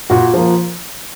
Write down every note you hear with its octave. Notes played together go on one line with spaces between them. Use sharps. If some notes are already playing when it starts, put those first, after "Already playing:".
A#2 F#4
F3 A#3